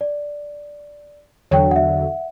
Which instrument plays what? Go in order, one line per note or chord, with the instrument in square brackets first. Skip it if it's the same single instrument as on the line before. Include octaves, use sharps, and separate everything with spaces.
[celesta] D5
[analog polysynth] E2 D3 F#3 [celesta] C#5 G5
[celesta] E5 F#5